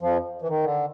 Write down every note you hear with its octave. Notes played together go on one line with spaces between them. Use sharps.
F2 F3
E3
D#3
D3